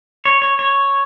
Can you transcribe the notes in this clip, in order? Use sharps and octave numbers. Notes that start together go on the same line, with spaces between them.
C#5
C#5
C#5